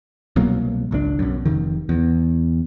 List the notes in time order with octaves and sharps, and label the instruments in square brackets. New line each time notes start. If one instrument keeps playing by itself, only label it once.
[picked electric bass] C2 B2 F#3 A#3
G#1 C#2 C3 D4
B1 F#2
F1 C3 D#3
E2